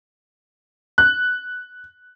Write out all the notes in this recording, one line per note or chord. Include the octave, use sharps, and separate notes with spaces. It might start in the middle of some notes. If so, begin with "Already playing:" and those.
F#6